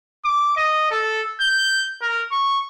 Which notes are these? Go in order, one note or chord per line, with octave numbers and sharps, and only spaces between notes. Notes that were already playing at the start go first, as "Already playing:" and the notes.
D6
D#5
A4
G6
A#4
C#6